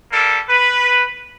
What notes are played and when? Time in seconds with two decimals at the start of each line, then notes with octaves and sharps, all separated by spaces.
0.12 G3 A#3 A4
0.49 B4